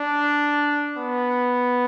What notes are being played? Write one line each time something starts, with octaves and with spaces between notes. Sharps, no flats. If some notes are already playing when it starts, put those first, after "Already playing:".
Already playing: D4
B3